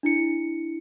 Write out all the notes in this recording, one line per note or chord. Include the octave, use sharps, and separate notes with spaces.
D4 E4 C#7